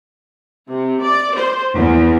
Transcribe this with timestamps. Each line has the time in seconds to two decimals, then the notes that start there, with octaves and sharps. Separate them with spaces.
0.69 C3
1.02 D5
1.35 C5
1.75 E2